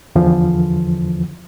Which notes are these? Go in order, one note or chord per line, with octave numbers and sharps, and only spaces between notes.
E2 D3 E3 F3